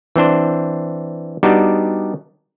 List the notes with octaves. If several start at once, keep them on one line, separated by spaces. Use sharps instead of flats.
E3 C4 D4 C5
G3 B3 D4 D#4 F#4 G4